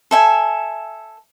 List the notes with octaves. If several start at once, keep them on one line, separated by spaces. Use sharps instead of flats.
A4 E5 G#5